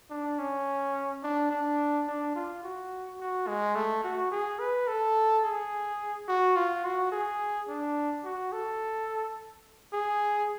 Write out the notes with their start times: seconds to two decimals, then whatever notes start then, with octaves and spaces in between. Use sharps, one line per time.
0.10 D4
0.39 C#4
1.23 D4
1.50 D4
2.07 D4
2.36 F4
2.63 F#4
3.20 F#4
3.47 G#3
3.75 A3
4.04 F#4
4.31 G#4
4.59 B4
4.88 A4
5.44 G#4
6.28 F#4
6.56 F4
6.85 F#4
7.12 G#4
7.68 D4
8.24 F#4
8.52 A4
9.93 G#4